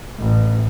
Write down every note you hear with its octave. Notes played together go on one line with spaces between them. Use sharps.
A1